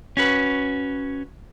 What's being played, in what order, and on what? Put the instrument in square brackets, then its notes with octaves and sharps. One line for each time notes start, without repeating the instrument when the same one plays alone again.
[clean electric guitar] C#4 F#4 B4